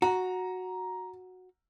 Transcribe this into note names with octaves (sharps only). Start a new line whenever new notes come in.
F#4 A#5